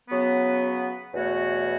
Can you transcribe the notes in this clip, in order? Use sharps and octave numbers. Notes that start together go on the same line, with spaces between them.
C#3 F#3 B3
E2 B2 A3 F#4 C#5